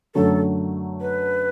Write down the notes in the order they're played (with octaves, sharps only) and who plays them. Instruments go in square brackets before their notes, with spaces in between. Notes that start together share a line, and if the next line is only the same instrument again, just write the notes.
[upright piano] F#2 D3 F#3 A3 [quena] A4
[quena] B4